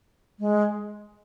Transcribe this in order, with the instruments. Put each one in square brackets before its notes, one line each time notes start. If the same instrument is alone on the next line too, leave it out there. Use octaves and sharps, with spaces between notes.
[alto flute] G#3